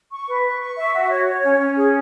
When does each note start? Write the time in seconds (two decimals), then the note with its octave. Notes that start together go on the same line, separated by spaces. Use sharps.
0.10 C#6
0.28 B4
0.44 C#6
0.60 C#6
0.77 E5
0.93 F#4
1.10 C#5
1.26 C#5
1.44 C#4
1.60 C#4
1.76 G#4